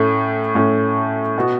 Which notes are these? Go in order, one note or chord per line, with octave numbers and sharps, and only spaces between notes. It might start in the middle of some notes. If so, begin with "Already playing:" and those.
Already playing: A2 A3 C#4
A2 A3 C#4
B2 B3 F#4